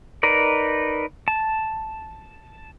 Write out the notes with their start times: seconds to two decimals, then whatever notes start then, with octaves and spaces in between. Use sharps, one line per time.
0.23 D#4 A#4 B4 D5
1.28 A5